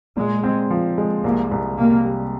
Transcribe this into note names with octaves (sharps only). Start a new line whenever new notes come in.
A#2 G#3
C4
F3
G#3
C2 A#3
C2
C3 A#3
G3